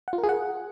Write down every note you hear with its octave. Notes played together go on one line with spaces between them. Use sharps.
F#5
F4
A#4
G#4
F#5